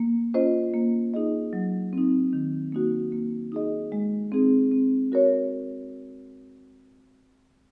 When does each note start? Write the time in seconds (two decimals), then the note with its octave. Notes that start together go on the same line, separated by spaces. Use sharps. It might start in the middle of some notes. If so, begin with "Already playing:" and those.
Already playing: A#3
0.34 C#4 F4 C5 D#5
0.74 A#3
1.14 D#4 G#4 D#5
1.53 F#3
1.93 C4 D#4
2.33 D#3
2.72 A#3 D#4 F#4
3.12 A#3
3.52 D#4 G#4 D#5
3.92 G#3
4.32 C4 D#4 G#4
4.72 C4
5.12 F#4 A#4 C#5